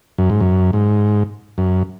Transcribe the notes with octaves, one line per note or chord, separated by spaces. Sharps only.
F#2
G#2
F#2
G#2
F#2